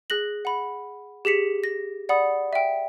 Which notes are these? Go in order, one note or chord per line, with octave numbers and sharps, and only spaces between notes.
G#4 F#6 A#6 F#7
F#5 B5
G4 G#4 B6 C#7
A#6
D5 F#5 B5 D#6
E5 G5